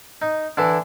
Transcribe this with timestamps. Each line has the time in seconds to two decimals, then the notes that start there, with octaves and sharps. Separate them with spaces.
0.22 D#4
0.57 D3 E3 D4 E4